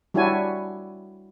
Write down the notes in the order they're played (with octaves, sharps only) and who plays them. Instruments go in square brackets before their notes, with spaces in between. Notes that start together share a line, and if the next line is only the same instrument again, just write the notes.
[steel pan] G3 D4 E4 F#4 C#5 G#5